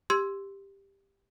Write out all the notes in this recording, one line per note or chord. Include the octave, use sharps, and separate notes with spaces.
G4 C6 E6 G#6